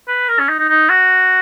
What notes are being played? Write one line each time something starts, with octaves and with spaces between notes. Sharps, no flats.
B4
A#4
C#4
D#4
D#4
D#4
F#4